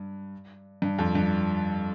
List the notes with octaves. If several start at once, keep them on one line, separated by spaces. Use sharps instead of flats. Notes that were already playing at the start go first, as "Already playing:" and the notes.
Already playing: G2
G2
F2
G2